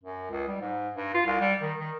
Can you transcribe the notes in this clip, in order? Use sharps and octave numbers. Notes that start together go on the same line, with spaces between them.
F#2
C#2
G3
G#2
G2
F4
C2
G3
D#3
D#3